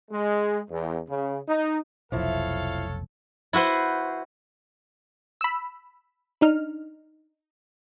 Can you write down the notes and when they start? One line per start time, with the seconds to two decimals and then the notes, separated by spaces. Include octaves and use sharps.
0.11 G#3
0.69 E2
1.09 C#3
1.48 D#4
2.12 F1 B1 F3 E4 A4 C#5 F5
3.53 E4 F#4 B4 C5
5.41 B5 E6
6.41 D4 D#4 F6